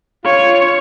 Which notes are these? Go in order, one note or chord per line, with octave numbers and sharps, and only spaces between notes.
F4 C#5